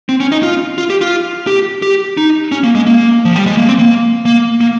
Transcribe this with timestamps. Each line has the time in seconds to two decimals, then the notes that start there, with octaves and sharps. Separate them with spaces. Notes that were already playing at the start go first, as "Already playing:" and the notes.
0.09 C4
0.20 C#4
0.32 D#4
0.43 F4
0.78 F4
0.90 G4
1.01 F4
1.47 G4
1.82 G4
2.17 D#4
2.52 C#4
2.64 A#3
2.75 G#3
2.87 A#3
3.25 F3
3.36 G3
3.46 G#3
3.57 A#3
3.67 C4
3.79 A#3
4.26 A#3
4.61 A#3